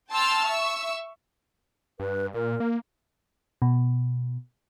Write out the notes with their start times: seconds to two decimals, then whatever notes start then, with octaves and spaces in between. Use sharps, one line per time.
0.11 G5 A5 C6 E6 F6
0.45 E5 C#6 E6
2.00 G2 B4
2.34 A#2 A#4
2.60 A#3
3.62 B2